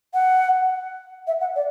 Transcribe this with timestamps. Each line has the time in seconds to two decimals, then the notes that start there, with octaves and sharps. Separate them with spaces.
0.14 F#5
1.27 E5
1.40 F#5
1.55 D5